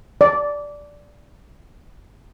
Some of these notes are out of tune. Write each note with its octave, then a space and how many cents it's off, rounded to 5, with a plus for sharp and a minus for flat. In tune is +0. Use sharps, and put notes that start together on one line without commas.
D5 -5